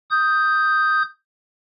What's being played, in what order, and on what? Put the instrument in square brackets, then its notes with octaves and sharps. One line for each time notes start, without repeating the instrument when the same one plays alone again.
[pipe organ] D#6 G6